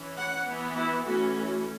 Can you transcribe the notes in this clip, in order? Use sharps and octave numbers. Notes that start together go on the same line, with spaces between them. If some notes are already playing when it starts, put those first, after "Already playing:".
Already playing: E3 C#4
F#5
E3 B3
E4
E3 A3 C#4 F#4
F#4